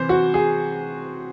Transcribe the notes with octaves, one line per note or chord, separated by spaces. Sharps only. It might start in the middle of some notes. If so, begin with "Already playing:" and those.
Already playing: C3 E3 C5
F#4
G#4